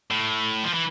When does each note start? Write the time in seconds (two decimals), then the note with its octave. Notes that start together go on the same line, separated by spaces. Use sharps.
0.11 A2
0.64 F3
0.74 E3